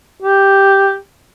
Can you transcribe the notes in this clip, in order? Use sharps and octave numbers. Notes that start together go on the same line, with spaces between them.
G4